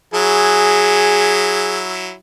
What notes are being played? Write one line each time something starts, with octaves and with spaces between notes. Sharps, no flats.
F#3 E4 G#4